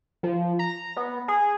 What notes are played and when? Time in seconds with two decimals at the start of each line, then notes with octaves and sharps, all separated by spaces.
0.23 F3
0.59 A#5
0.96 B3
1.28 G#4